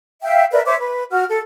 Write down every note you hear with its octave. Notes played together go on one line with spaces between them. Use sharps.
E5 F5 G5
A#4 B4 D5 E5
C5 C#5 E5 D6
B4
F#4 F6
A4